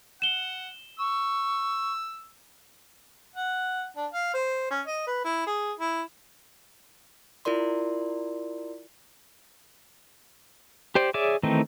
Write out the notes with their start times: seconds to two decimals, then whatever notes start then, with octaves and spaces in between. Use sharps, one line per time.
0.22 F#5 E7 G7
0.99 C#6 E6
3.36 F#5
3.96 D4
4.13 F5
4.34 C5
4.71 C#4
4.87 D#5
5.07 B4
5.25 E4
5.46 G#4
5.79 E4
7.45 E4 F4 A#4 D5 C6
10.95 G4 C5 D5
11.14 G#4 C#5 D5 E5 D6
11.43 D#3 E3 A3 C4 D#4